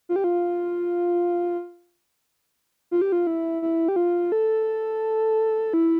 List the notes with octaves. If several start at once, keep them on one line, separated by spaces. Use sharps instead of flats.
F4
G4
F4
F4
G4
F4
E4
E4
G4
F4
A4
E4